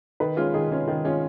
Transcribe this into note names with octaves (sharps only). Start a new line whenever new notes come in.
D#3 B4
G#3 C#4 F4
D#3 G#4
G#3 C#4 F4
D#3
G#3 C#4 F4